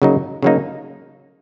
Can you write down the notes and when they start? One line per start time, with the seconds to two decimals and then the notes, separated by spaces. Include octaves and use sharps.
0.02 C#3 F#3 A#3 D#4
0.42 C#3 F#3 A#3 D#4